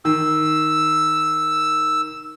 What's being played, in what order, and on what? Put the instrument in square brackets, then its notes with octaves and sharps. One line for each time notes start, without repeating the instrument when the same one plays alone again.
[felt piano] D#3 [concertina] E6